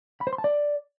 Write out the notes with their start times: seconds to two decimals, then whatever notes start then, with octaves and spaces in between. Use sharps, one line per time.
0.21 B5
0.27 C5
0.33 C6
0.38 A5
0.44 D5